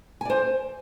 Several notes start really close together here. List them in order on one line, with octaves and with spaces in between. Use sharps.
G#5 D5 C5